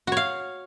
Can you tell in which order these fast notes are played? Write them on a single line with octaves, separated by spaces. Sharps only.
F#4 C#5 F5